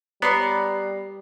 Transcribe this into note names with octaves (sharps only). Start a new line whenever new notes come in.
G3 B3 B4 C#5 D5 A#5 C7